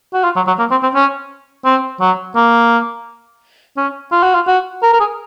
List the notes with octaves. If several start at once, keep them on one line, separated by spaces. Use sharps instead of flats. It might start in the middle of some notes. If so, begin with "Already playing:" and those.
F#4
F4
F#3
F#3
A#3
C4
C4
C#4
C4
F#3
A#3
C#4
F4
F#4
F4
F#4
A#4
A#4
G#4